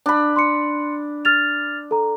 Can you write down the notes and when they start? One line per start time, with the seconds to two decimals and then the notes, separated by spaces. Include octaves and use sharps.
0.06 D4 B5
0.36 C6 C#7
1.25 F6 A6 F7
1.91 A4 A#5